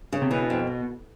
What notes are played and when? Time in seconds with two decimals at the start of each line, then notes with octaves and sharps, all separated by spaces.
0.12 C#3
0.22 C3
0.31 B2 E3
0.50 F2